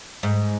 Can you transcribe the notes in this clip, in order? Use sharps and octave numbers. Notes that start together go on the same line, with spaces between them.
G#2